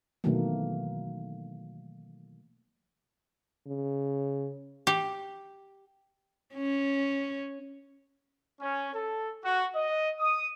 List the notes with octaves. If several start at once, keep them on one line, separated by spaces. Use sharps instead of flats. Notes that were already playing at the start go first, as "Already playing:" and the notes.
B2 D#3 E3 F#3 A3 A#3
C#3
G4
C#4
C#4
A4
F#4
D#5
D#6